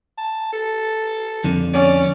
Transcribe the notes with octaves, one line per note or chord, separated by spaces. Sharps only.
A5
A4
F2 D3
C#4 D5